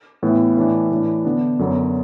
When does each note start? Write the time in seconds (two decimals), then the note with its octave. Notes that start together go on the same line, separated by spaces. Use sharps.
0.23 A2 E3 B3 E4
0.57 A2 E3 D4
0.91 A2 E3 D4
1.25 D3 B3 D4
1.59 F#2 D3 F#3 B3